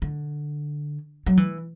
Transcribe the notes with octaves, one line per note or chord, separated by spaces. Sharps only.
D3
F#3
E3